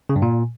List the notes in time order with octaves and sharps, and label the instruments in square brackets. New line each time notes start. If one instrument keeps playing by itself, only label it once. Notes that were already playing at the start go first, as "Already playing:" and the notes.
[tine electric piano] C#3
G2
A#2